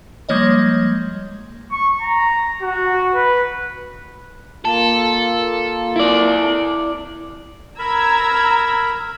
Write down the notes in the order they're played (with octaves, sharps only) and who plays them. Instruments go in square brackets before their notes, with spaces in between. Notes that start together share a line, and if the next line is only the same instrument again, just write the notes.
[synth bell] F3 G3 G#3 A#3 C#5 D#5
[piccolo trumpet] C#6
A#5
F#4
B4
[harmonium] A#3 F4 [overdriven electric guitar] A4
[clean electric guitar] E4 D5
[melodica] A#4 B5 [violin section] A#5 E6 G#6